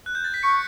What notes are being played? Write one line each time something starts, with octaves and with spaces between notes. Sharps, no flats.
F#6
G6
A6
B6
C#6 C#7